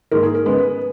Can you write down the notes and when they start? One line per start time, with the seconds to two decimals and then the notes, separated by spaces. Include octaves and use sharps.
0.11 G#2 D#3 A#3 A#4
0.23 G#4
0.35 A#4
0.46 C#3 G#3 B3 B4